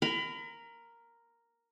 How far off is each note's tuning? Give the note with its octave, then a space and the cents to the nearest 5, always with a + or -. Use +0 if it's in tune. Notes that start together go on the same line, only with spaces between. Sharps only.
A#4 +0 B5 +30